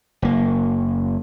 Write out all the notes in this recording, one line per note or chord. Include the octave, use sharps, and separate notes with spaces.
F#1 A#3